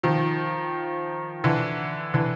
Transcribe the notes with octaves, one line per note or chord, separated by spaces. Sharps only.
D#3 F3
D3 E3
D3 E3